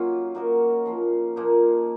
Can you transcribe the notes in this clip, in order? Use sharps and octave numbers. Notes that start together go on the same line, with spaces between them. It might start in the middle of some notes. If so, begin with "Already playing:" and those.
Already playing: F#3 A#3 C#4 D#4 F4
A#3 D#4 F#4 A#4
F3 A#3 F4
A#2 F3 A#3 D#4